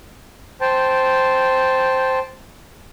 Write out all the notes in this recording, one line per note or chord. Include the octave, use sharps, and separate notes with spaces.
C5 G5 A5